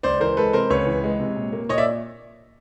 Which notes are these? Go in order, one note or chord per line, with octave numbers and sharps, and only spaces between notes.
C#2 C5 D5
E3 A#4 C5
G#3 A4 B4
C3 A#4 C5
C#2 B4 C#5
E3
G#3
C3
A#2
A#3
A#2 C#5 D#5
D5 E5